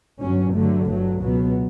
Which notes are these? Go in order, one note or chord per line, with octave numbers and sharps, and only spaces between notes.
G1 G2 F#3 C#4
G2 D3 F#3 A3
G1 G2 F#3 A3
C#2 B2 F#3 B3